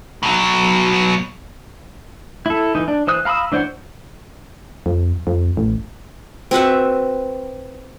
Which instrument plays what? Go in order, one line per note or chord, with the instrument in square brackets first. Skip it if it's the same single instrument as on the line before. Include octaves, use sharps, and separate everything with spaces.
[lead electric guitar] B2 F#3
[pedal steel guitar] E4 A4
E3 D#4
D4
E3 C5 D#6 F#6
F5 A#5 B5 D#6 E6
E3 D4 C5 C#5 F#5
[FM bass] F2
F2
A1
[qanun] C4 F#4 B4 E5